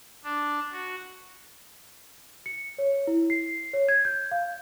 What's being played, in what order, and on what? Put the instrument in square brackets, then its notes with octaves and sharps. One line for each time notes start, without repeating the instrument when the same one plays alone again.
[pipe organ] D4
F#4
[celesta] C#7
C#5
E4
C7
C#5
G#6
G6
F5